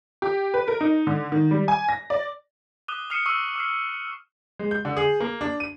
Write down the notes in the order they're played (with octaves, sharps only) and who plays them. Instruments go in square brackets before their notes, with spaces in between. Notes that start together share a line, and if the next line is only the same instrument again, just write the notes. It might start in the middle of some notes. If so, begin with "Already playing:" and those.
[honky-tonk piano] G4
B4
A#4
D#4
D3
D#3
G3
G#5
A#6
D5
[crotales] D6 D#6 F#6 D#7 G7
D#6 F6 C7 C#7 D#7 E7
C#6 D#6 E6
D6 F6 C7
C#7
[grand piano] G#3
G6
D3
G#4
A#3
D4
D#7